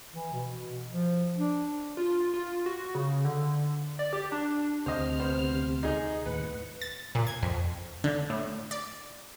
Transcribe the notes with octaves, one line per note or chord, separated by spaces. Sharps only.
E3
B2
F3
D4
F4
F4
F#4
C#3
D3
D5
G4
D4
D2 C3 C5 D#5 F6
B3 C5
D#4 G#4 D#5
D#2 A2 B4 F#5
A6
A#2
G#6
F2
D3
A2
D5